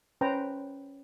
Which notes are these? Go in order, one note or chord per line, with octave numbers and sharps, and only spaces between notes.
C#4 B4 C5 G5 A#5